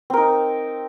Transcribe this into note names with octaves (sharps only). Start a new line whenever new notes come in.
C4 D#4 A#4